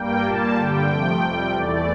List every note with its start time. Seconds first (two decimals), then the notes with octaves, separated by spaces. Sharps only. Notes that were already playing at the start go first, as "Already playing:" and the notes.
Already playing: G2 G3 A#3 G5
0.23 A#2 G3 A#3 A5
0.55 G2 D3 G3 G5
0.89 C3 F3 A3 G5
1.21 F2 C3 G3 G5
1.53 E2 E3 A3 D5